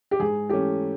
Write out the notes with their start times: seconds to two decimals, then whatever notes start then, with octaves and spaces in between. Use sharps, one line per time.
0.11 G4
0.19 G#2 G#4
0.49 E3 A3 C#4 G4